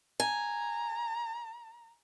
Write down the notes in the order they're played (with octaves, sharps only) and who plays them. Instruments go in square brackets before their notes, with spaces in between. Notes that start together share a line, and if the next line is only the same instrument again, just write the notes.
[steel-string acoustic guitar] G#5 [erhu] A#5